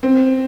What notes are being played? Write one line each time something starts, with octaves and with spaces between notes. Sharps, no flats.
C4